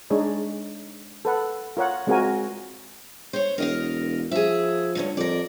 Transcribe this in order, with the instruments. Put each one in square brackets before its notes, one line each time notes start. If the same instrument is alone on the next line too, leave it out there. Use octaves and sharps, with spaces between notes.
[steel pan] G#3 D4 D#4 G#4 C#5
A4 B4 F#5
F4 A#4 C#5 F#5
G#3 C4 F4 F#4 A#4 G#5
[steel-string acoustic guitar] C5 C#5
[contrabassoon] E1 [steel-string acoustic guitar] A#4 D#5 F5
[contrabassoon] F3 [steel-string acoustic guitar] G#4 E5
[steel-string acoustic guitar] D2 G2 C#4
[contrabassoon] F2 [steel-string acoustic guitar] A#4 D5